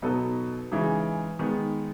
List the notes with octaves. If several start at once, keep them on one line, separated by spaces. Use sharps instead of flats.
B2 F#3 B3 D#4 A4
C#3 E3 G#3 D#4 G#4
D#3 G#3 B3